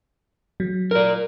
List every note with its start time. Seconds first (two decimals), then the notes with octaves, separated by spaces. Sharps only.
0.60 F#3
0.91 A#4 D5